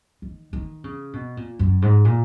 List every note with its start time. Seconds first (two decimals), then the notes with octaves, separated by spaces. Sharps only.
0.22 D#3
0.53 D#3
0.84 C#3
1.13 B2
1.37 A#2
1.59 F#2
1.82 G#2
2.05 A#2